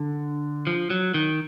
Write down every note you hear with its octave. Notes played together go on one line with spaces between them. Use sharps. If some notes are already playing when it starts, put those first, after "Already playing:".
Already playing: D3
F3
F#3
D#3